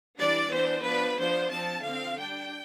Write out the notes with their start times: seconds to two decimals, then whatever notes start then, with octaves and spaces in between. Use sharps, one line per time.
0.20 E3 G3 D4 D5
0.52 E3 B3 D4 C5
0.85 F3 B3 D4 B4
1.18 F3 B3 D4 C5
1.51 F3 C4 A5
1.83 D3 F3 C4 F5
2.17 G3 D4 G5